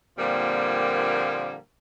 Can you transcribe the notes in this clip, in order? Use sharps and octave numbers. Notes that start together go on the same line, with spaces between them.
A#2 D3 F3 G3 A#3 C4